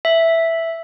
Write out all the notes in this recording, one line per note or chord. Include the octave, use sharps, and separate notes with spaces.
E5